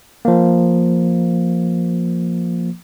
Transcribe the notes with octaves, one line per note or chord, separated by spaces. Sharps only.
F3 A#3